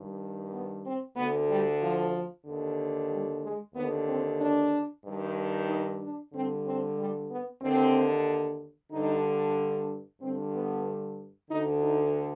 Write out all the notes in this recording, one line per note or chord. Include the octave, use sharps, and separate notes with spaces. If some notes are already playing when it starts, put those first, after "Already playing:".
Already playing: G2 D#3
B3
C4
D2 D3 B3
G3
F3
D#2 D3
G3
G#3
D#2 D3 B3
C4
D4
G2 D#3
D#4
D4
G2 D3 C4
C4
G3
B3
D#2 D3 C4
G2 D3 D#4
D4
G2 D3 C4
B3
D2 D3 D#4
D#4